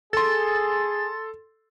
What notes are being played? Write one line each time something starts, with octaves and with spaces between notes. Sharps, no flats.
G#4 A4 C6 A6